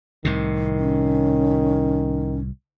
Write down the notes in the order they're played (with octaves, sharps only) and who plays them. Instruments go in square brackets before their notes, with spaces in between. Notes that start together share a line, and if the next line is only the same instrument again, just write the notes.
[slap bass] C2 A2 C3 [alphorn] D#3
[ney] C#4